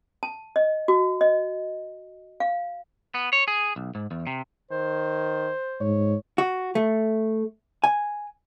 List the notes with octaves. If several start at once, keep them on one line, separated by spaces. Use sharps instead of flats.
A5
D#5
F#4
D#5
F5
B3
C#5
G#4
B1
G#2
E2
C3
D#3 C5
G#2 C#5
F#4
A3
G#5